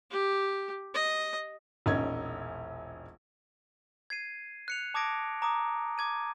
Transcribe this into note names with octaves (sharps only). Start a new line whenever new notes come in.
G4
D#5
E1 A#1 C#4 D#4 G#6
G#6 C7 D#7
F#6 C#7 F7
A5 D6 D#6 G#6 A#6 D7
A#5 D6 D#6
D6 G#6 D#7